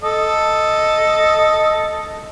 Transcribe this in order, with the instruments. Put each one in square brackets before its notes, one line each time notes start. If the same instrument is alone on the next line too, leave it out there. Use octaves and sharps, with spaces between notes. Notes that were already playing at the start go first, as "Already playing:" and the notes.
[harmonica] A4 D#5